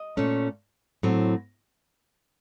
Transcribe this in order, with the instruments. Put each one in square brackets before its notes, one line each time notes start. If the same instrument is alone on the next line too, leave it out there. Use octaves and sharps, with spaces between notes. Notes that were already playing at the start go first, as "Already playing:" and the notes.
Already playing: [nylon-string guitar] D#5
A#2 A3 C#4
A2 F#3 C4